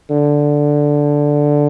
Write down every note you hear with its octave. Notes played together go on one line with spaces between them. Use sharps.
D3